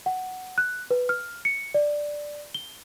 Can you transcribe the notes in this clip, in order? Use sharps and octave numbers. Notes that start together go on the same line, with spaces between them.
F#5
F#6
B4
F6
C#7
D5
G7